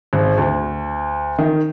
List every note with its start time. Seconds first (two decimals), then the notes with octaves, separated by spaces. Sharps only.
0.13 G#1
0.37 D2
1.38 D#3